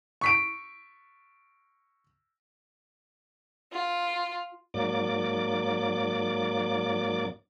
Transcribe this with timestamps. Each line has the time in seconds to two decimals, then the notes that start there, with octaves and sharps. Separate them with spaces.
0.21 C#6 B6 D7
3.73 F4
4.74 G#2 F#3 A#3 D5 D6